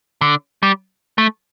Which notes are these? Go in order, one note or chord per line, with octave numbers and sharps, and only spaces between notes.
D3
G3
A3